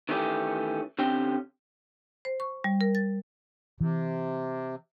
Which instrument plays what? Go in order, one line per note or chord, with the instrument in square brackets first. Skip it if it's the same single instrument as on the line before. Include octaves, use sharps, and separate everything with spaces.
[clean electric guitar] D#3 E3 A3 C#4 G4
D3 C4 C#4 G4 G5
[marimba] C5
C#6
G3
A#4
A6
[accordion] C3 [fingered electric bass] E3